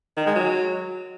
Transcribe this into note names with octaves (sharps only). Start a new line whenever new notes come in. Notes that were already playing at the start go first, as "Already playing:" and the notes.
D#3
G#3
F#3